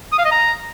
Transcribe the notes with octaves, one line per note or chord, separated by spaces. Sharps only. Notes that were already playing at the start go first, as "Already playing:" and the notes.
D#6
F5
D#5
A#5